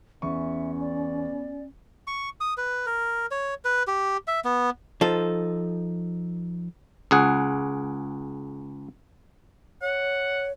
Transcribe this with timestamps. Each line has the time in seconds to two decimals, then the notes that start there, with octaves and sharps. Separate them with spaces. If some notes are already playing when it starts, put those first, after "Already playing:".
0.22 E2 B3 C#4 E5 C#6
0.80 D5
2.07 C#6
2.41 D#6
2.57 B4
2.86 A#4
3.31 C#5
3.65 B4
3.87 G4
4.27 E5
4.45 B3
5.01 F3 D#4 A4
7.11 C#2 G#4 F#5
9.82 C#5 F#5